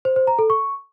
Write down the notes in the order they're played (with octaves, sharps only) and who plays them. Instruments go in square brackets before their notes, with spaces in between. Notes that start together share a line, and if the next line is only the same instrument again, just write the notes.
[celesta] C5
C5
A#5
A4
C#6